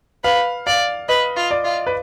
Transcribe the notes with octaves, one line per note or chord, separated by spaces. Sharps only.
B4 F5
D5 F5
B4 D#5
F4
D5
F4
B4